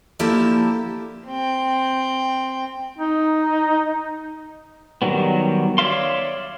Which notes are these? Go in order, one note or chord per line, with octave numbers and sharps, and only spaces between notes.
D3 F3 A#3 E4 G4 A4
C4 G5
D#4
D#3 F#3 G3 B3
C#5 D5 E5 F5 C6